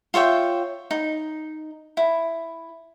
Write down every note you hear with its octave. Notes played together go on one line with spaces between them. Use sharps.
F4 C#5 E5 G5
D#4
E4